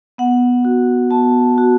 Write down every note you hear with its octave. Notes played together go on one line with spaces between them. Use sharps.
B3 F#5
F#4
B3 A5
F#4